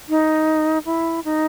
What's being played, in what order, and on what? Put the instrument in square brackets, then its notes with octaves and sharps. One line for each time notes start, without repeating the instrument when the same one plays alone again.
[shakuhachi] D#4
E4
D#4